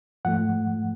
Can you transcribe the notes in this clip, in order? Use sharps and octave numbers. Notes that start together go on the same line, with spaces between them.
G#2 F3 A3 F#5